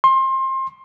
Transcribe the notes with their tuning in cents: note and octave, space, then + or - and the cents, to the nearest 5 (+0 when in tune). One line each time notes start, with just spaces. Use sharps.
C6 +25